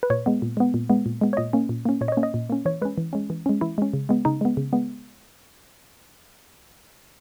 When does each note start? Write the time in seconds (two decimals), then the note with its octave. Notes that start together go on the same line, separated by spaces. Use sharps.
0.03 B4
0.10 A#2 C#5
0.26 G#3 B3
0.42 A#2
0.57 G#3 B3
0.74 A#2
0.90 G#3 B3
1.06 A#2
1.21 G#3 B3
1.33 C#5
1.37 A#2 D#5
1.53 A#3 C#4
1.69 A#2
1.85 A#3 C#4
2.01 A#2 C#5
2.08 D#5
2.12 C#5
2.17 A#3 C#4
2.23 D#5
2.34 A#2
2.50 A#3 C#4
2.65 E3 C#5
2.82 G#3 C#4 B4
2.98 E3
3.13 G#3 C#4
3.30 E3
3.46 G#3 C#4
3.61 E3 E4
3.78 G#3 C#4
3.93 C#3
4.09 G#3 B3
4.25 C#3 D#4
4.41 G#3 B3
4.57 C#3
4.73 G#3 B3